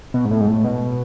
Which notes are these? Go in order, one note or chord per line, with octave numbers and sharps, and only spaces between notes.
B2
G#2
A2
G#2
A2
B2